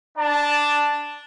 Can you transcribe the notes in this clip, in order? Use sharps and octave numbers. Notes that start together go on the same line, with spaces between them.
D4 D5 A5